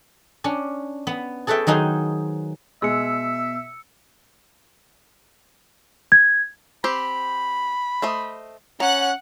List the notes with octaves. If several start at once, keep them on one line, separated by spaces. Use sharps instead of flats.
C#4 D4
B3 B5
G#4 A4 B4 C#5 E5 G5
D#3 F#3 D#4 G#4 C5
B2 G#3 E5 E6 C#7
G#6
C4 G4 C5 B5
A3 C5 D#5
C#4 F#5 A#5 F#6